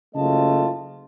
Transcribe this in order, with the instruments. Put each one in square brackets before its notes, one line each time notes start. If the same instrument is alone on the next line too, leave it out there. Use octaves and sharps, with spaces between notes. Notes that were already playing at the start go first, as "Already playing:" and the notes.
[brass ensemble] F#1 C#3 A3 F4 D#5 A5